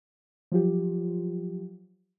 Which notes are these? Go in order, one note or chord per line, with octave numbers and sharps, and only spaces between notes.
F3 F#3 F4 G4